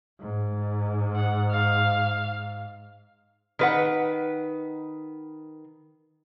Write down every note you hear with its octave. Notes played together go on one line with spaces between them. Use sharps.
G#2
F#5
F5
D#3 B4 F#5